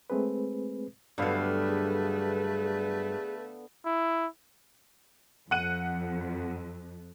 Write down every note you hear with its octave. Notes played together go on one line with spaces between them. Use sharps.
G#3 A3 C4 G#4 B4
G2 D3 F#3 A3 B3 B4 F5
G#4
E4
F2 F#5 F#6 D#7